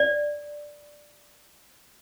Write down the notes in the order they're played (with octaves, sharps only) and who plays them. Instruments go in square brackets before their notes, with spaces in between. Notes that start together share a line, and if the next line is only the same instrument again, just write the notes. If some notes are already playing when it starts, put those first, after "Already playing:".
Already playing: [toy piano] D5